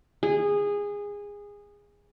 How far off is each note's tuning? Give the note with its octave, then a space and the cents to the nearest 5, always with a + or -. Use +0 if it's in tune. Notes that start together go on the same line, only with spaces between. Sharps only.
G#4 -20